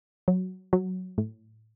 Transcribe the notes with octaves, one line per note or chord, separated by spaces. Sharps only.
F#3
F#3
A2